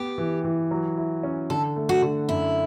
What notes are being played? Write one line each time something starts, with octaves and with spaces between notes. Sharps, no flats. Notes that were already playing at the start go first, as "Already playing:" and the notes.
Already playing: B3 G4
E3
E3
F#3
E4
C#4
D3 A4
A3
F#4
D3
F#2 E4